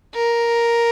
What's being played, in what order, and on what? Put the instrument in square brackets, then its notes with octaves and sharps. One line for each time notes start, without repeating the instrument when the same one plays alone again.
[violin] A#4